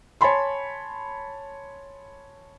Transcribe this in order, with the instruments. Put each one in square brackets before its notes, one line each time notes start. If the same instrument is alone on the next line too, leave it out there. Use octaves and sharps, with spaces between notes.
[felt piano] C#5 G#5 A5 B5 C6